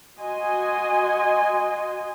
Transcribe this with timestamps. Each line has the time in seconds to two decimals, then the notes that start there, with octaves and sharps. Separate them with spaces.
0.19 F#4 D#5 G#5 C6